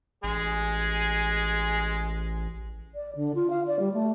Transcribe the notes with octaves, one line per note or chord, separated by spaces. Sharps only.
A1 G#3 G#4 G#5
D5
D3
F4
F5
D5
G3
A3